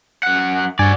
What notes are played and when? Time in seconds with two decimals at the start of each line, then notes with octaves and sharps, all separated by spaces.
0.23 F#2 F#5
0.79 G2 F#4 D5 G#5 G#6